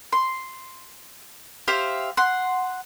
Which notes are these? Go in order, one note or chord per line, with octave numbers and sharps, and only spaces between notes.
C6
G4 C5 E5 F5
F#5 C6